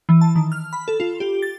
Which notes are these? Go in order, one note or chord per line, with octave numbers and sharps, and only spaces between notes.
E3
A5
D#3
F6
B5
A4
F4
G4
A6